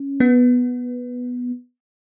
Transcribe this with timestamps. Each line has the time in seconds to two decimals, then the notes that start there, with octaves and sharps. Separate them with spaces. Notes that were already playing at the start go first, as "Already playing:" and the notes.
Already playing: C#4
0.20 B3